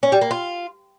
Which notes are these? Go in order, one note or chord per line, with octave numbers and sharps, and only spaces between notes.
C#4
G3
A#3
F4